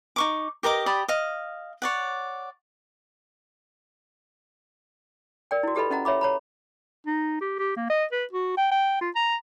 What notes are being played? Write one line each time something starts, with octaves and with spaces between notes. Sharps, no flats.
D#4 C#6 D6
G4 A#4 D#5 D6
G4 D5 B5 D#6
D#5 F5
C#5 D5 F#5
A#4 D5 G5
E4 F#4
F4 G4 A4 B4 D#5 B5
C#4 D#5 F#5 A#5
C#5 E5 B5 D6
C#5 A#5 B5
D#4
G4
G4
A#3
D#5
B4
F#4
G5
G5
F4
A#5